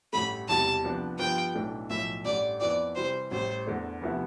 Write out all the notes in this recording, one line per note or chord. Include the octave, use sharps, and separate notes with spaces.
A1 G2 D3 A3 B5
E1 E2 C3 E3 G3 A5
C2 C3 F3 B3 D4
G2 F3 B3 F4 G5
B1 A2 E3 A3 D4
B1 A2 F3 E5
A1 G2 D3 D5
F2 E3 B3 D5
C3 E3 G3 C5
A1 A2 G3 C5
E2 D3 A3 D4
D2 C3 F3 B3 E4